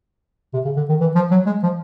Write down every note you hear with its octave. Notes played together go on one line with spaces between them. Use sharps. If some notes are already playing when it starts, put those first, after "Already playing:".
C3
C#3
D3
D#3
E3
F3
F#3
G#3
F3